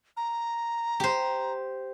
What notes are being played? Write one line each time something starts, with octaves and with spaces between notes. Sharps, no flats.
A#5
G4 C5